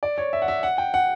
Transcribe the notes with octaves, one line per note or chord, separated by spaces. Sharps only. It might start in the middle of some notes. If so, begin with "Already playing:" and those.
D5
C#5
E5
F#5
E5
F#5
G5
F#5